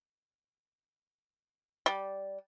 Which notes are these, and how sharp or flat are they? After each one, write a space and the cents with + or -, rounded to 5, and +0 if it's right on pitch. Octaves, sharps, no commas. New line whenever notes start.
G3 -10